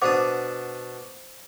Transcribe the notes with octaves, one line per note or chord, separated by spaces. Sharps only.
B2 D4 C5 F#5 D6 D#6